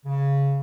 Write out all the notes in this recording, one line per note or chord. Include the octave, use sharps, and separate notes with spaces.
C#3